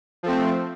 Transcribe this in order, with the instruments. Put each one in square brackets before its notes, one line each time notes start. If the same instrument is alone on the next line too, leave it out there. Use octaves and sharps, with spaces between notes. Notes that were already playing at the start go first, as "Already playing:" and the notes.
[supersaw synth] F3 A3 C4